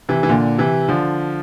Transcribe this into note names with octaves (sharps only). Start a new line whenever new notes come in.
C3 E3
E3
A#2 D3
C3 E3
D3 F3